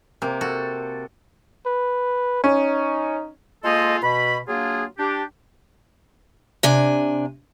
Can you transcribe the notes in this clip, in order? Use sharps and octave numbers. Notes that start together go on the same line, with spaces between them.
C3 A#3
F#4 A4
B4
C#4 D#4
G#3 A#3 F4 A4 C5 D#5
B2 B5
F#3 A#3 D4 F4 G#4
D4 G4
C3 D4 G#5